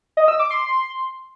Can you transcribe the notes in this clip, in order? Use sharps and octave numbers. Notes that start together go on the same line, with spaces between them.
D#5
E6
D6
C6